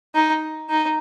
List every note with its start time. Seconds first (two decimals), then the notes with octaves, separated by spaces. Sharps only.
0.15 D#4
0.70 D#4